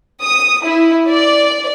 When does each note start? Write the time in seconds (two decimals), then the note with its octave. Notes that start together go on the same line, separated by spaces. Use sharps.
0.22 D#6
0.65 E4
1.11 D5